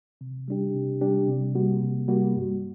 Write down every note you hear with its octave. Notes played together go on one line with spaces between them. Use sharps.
C3
G3 D4 G4
C3
G3 D4 G4
C3
G3 A#3 F#4
C3
G3 A#3 F#4
G2